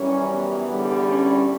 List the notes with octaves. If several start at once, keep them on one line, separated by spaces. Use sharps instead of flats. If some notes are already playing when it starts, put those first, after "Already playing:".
Already playing: F#2 E3 G3 C#4
B3
E2 D3 G3
C#4